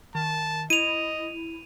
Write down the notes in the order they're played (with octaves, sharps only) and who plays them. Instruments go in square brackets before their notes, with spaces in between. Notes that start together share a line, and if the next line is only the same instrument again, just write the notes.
[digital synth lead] D#3 [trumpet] A5
[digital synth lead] E4 [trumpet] D#5 [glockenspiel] D#7 F7